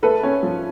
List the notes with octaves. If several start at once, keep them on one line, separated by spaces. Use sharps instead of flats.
A3 A4 B4
C#4
F3